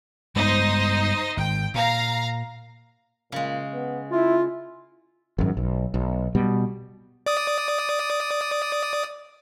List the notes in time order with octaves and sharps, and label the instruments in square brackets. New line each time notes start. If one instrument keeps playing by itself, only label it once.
[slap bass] G2 G#3 B3 [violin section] D#4 C5 D#5
[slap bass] G#1 [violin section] G5
[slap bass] A#2 [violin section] F5 A#5
[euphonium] A#2 [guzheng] C#3 G#3
[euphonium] B3
[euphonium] E4 [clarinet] F4
[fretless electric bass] G#1 F#2
B1
B1
B2 G3
[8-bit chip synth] D5 D#6